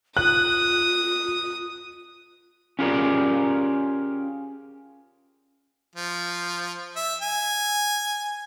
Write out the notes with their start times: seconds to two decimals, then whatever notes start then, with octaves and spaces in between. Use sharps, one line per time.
0.17 F4 D#6 F#6
2.79 C#4 F4 G4 G#4 A#4 D5
5.96 F3
6.96 E5
7.21 G#5